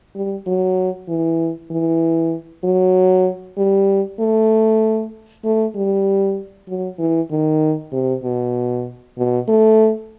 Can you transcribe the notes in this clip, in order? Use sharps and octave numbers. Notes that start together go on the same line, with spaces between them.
G3
F#3
E3
E3
F#3
G3
A3
A3
G3
F#3
E3
D#3
C3
B2
B2
A3